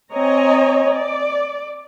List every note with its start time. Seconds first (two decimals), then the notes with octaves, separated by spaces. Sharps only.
0.13 C4 C#5 D#5 G#5 A#5
0.95 D5